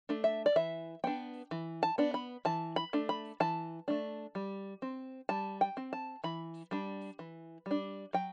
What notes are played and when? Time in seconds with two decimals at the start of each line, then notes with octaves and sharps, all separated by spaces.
0.09 A3 D4
0.24 E5
0.46 D5
0.56 E3 E5
1.04 B3 D4 G5
1.51 E3
1.83 A5
1.98 B3 D4
2.14 B5
2.45 E3 A5
2.76 B5
2.93 A3 D4
3.09 B5
3.40 E3 A5
3.88 A3 D4
4.35 G3
4.82 C4
5.29 G3 A5
5.61 G5
5.77 C4
5.93 A5
6.24 E3 B5
6.71 G3 D4
7.19 E3
7.66 G3 D4
8.13 F#3 G5